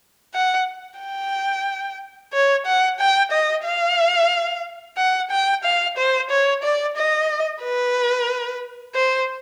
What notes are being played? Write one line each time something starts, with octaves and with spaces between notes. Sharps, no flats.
F#5
G5
C#5
F#5
G5
D#5
F5
F#5
G5
F5
C5
C#5
D5
D#5
B4
C5